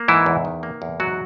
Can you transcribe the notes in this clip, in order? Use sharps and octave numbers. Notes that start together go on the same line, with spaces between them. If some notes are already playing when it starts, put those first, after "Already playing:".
Already playing: A#3
G#2 E3 E4
E2
D#3
A#3
E2
G#2 F#3 F#4